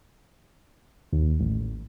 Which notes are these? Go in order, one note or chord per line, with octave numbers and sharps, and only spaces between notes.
D#2
A1